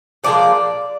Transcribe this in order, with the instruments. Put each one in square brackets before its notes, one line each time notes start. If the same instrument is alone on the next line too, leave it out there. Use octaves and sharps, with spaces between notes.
[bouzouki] A#2 F3 G#3 D5